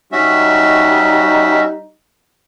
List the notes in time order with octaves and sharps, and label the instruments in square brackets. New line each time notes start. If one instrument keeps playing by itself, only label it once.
[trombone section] G3 D#4 [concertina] C#4 F#4 E5